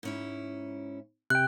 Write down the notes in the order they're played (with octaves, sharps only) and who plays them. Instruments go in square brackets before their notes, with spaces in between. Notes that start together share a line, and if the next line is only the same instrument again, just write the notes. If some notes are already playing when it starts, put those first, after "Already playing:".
[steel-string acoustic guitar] G#2 C#4 E4
[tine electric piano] C3 G5 [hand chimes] F#6